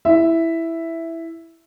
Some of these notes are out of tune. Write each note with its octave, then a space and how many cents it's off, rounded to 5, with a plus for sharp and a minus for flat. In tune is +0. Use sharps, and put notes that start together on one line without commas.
E4 +0 E5 +0